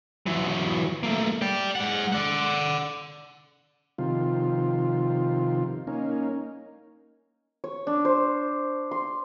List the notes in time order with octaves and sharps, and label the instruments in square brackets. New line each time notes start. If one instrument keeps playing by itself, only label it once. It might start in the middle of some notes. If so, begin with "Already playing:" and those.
[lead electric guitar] E3 F#3
A3 A#3
D5 G5
G#3 F#5
D5 F#5
[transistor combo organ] C3 D#3 F3 F4
A#3 C#4 D#4
[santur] C#5
D4
C5
C6